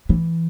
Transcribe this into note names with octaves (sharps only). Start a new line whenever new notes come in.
E3